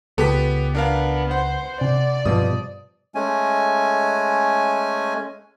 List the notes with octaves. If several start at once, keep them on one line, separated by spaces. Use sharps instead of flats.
C#2 B3 G4 A4 B6
B3 D4 A#4 F5
C5 F#5
C3 D5
G2 B2 F3 D#6
G#3 A3 C#4 G#5